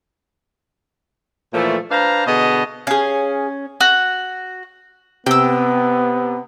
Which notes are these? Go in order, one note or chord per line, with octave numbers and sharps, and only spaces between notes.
A#2 E3 F3 A3
D4 B4 C5 F5 A#5
B2 D3 B3 G#4 D#5
C#4 G#4 F5
F#4
C3 B3 G5 E6